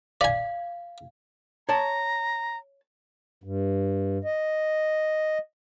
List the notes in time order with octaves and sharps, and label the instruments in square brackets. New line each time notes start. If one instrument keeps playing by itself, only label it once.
[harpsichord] D5 G#5 [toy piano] F5
[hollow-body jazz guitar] C#5 A5 [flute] A#5
[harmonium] G2
D#5